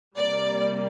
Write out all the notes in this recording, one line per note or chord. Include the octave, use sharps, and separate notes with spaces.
C3 G3 A#3 D5